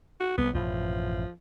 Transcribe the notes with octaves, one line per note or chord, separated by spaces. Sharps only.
F#4
C2 B3
A1 F#2 B2 F3